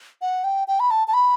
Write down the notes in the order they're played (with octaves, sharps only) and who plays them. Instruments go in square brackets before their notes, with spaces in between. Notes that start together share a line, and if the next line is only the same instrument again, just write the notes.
[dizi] F#5
G5
G5
B5
A5
A5
B5